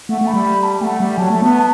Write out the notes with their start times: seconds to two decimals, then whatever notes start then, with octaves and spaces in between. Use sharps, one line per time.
0.09 A3 F#5
0.21 A3
0.27 B5
0.34 G3
0.45 B5
0.63 A5
0.81 A3 F#5
1.00 G3
1.17 F#3 A5
1.30 A3
1.42 B3